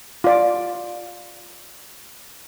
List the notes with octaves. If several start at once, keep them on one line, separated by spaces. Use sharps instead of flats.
F4 D5